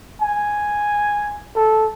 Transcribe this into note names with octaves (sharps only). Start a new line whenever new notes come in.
G#5
A4